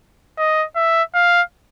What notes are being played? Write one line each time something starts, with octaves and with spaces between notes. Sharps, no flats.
D#5
E5
F5